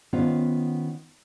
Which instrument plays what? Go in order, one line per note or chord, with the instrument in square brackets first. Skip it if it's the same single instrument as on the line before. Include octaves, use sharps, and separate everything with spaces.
[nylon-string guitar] D#3 B3 C#4 F4 C5